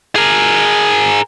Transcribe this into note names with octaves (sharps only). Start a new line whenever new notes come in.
G#4 A#4